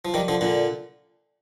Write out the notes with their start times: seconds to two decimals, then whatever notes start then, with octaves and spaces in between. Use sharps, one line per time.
0.05 F3
0.14 D#3 G3
0.28 D3 F3
0.41 A#2 D3